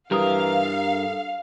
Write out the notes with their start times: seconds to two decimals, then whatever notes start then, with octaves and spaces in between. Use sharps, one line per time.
0.11 G2 E3 G4 A#4 F5 D#6
0.92 A4